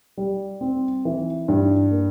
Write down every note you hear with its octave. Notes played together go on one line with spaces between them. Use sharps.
G3
C4
E3
G2
A#3